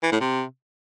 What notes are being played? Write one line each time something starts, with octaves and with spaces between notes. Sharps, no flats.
E3
A2
C3